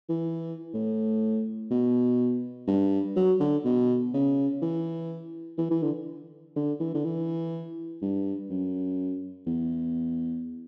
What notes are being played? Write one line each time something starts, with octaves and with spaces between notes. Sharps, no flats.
E3
A2
B2
G2
F#3
D3
B2
C#3
E3
E3
E3
D3
D3
E3
D3
E3
G2
F#2
E2